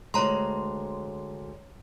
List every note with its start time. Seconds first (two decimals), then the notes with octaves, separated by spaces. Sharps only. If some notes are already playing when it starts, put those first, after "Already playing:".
0.14 D2 G#3 C#5 A#5 C6